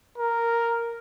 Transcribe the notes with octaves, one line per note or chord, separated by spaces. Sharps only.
A#4